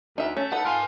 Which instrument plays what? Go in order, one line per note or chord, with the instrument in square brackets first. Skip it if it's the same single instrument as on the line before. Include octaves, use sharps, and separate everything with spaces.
[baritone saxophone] D2 [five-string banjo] D#4 E5
[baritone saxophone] A3 [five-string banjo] C#4
[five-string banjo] D#4 A4 B4 [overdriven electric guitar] F#5
[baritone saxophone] F4 [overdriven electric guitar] A#4 G#5